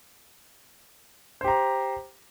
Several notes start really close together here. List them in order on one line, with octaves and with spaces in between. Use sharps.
C5 G4 A#5